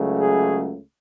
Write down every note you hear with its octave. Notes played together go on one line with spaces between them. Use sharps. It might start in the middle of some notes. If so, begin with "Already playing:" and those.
Already playing: C#2 C#3 F#3 A3
G#4